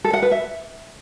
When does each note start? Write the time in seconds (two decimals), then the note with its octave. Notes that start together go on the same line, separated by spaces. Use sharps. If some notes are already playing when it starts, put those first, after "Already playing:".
0.04 A4
0.13 F#5
0.22 B4
0.31 E5